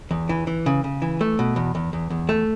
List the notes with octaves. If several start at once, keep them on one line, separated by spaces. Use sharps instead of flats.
E2
E3
E3
C#3
C#3
E3
A3
B2
E2
E2
E2
E2
A3